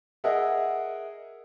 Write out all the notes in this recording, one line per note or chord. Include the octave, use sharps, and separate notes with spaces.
G#4 A#4 D#5 E5 F#5